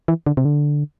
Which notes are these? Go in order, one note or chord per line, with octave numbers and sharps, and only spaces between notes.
E3
D3
C3
D3